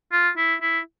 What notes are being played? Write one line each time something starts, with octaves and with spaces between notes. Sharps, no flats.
F4
E4
E4